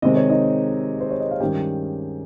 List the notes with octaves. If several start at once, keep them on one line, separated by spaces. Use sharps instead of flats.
C3 D#3 G#3 C4 D#5
C#5
D#4 D#5
C5
C#5
D#5
F5
G2 D#3 G#3 C#4 G4 G5